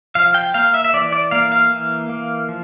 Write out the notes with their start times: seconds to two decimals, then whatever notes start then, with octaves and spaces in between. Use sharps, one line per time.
0.15 F3 F5
0.34 G5
0.54 A#3 F5
0.74 E5
0.84 E5
0.94 E3 D5
1.12 D5
1.31 A#3 F5
1.52 F5
1.71 E3
2.09 A#3
2.49 F3